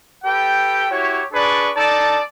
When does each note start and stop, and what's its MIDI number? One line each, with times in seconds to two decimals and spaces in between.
0.24 0.86 67
0.24 0.86 69
0.24 0.86 71
0.24 0.86 79
0.90 1.22 64
0.90 1.22 66
0.90 1.22 67
0.90 1.22 73
1.32 1.69 62
1.32 1.69 68
1.32 1.69 71
1.32 1.69 74
1.32 1.69 85
1.76 2.18 63
1.76 2.18 69
1.76 2.18 74
1.76 2.18 81